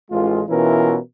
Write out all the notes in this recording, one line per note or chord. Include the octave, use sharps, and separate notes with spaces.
A1 G#3 F4
B2 E3 C#4 E4 F4 A#4